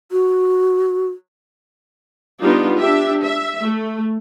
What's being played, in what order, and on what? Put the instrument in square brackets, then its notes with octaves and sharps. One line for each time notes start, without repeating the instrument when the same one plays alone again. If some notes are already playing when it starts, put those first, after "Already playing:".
[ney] F#4
[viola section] G3 B3 D4 D#4 F4
D4 G4 E5
E5
A3